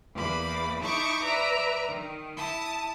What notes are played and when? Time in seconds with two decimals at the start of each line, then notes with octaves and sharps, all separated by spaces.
0.14 E2 A#3 D5 B5
0.80 D#4 E4 A5 C#6 D6
1.24 B4 D5 E5 A#5
1.88 D#3
2.37 E4 A5 D#6